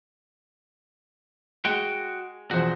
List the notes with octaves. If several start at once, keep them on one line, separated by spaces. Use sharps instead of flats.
G#3 F#4 G5
E1 F2 F#4 C5